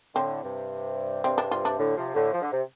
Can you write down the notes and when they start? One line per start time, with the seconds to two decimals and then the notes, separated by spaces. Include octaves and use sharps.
0.15 A2 D3 C4
0.43 G2 C3
1.24 G2 C3 C4
1.38 D4
1.51 G2 C3 F4
1.65 D4
1.78 A2 D3
1.96 C3 F3
2.09 F3
2.15 A2 D3
2.33 F3
2.42 D3
2.52 C3